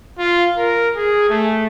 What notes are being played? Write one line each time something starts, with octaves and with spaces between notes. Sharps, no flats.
F4
A#4
G#4
A3